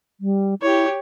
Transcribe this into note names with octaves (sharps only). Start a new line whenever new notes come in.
G3
E4 G4 C#5